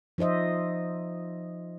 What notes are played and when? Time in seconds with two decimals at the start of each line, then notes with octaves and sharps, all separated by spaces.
0.18 F3 D#4 C5 D#5 E5